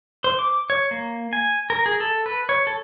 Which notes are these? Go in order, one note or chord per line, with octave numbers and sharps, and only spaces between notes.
C5
D6
C#5
A#3
G#5
A#4
G#4
A4
B4
C#5
A4